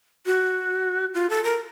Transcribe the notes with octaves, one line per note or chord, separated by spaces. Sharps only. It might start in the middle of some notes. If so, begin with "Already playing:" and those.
F#4
F4
A4
A#4